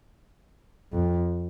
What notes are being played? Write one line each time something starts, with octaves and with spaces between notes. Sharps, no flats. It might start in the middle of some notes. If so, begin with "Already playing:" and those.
F2